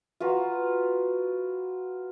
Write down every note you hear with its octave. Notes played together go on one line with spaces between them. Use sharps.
F4 F#4 B4 A#5